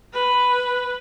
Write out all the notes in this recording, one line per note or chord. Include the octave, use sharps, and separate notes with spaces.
B4